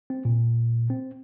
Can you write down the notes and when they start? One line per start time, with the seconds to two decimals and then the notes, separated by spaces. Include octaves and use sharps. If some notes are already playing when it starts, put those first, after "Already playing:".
0.10 C4
0.25 A#2
0.90 C4